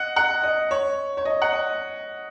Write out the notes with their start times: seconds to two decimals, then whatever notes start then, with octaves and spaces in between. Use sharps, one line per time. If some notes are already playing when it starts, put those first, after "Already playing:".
Already playing: D#5 F#5
0.16 F#5
0.43 D#5
0.71 C#5
1.17 C#5
1.25 D#5
1.42 F#5
1.52 D#5